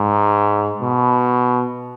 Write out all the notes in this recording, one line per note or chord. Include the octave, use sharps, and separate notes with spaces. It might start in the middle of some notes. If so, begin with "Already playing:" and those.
Already playing: G#2
B2